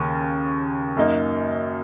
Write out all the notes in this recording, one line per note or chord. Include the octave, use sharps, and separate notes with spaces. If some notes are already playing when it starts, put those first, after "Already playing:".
Already playing: D#2 C#3 A#3 C#4
F#2 F#3 A#3 D#4